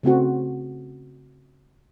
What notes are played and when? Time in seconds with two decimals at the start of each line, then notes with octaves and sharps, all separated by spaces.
0.03 C#3 A3 C4 F#4